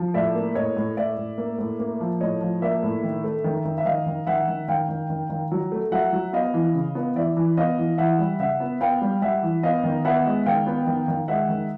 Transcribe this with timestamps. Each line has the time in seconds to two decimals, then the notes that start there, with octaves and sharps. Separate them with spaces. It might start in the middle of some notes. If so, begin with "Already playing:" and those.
Already playing: F3
0.14 A2 D5 E5
0.35 A#3
0.55 A2 C#5 D#5
0.76 A2
0.97 A2 D5 E5
1.17 A2
1.38 A#3
1.59 A2
1.79 A#3
2.00 F3
2.21 A2 C#5 D#5
2.41 F3
2.62 A#3 D5 E5
2.83 A2
3.03 D#3
3.24 A3
3.44 D#3
3.65 D#3
3.78 E5
3.85 D#3 D#5 F5
4.06 D#3
4.27 D#3 E5 F#5
4.48 D#3
4.68 D#3 F5 G5
4.89 D#3
5.10 D#3
5.30 D#3
5.52 F#3
5.72 A3
5.92 F#3 E5 F#5
6.13 F#3
6.33 B3 D#5 F5
6.54 E3
6.75 C#3
6.95 B3
7.15 E3 D5 E5
7.37 E3
7.57 B3 D#5 F5
7.78 E3
7.98 E3 E5 F#5
8.19 G3
8.40 C#3 E5 F#5
8.60 B3
8.81 B3 F5 G5
9.02 G3
9.22 G3 E5 F#5
9.43 E3
9.63 B3 D#5 F5
9.84 D#3
10.05 B3 E5 F#5
10.26 G#3
10.46 D#3 F5 G5
10.67 B3
10.87 D#3
11.08 D#3
11.28 G#3 E5 F#5
11.49 D#3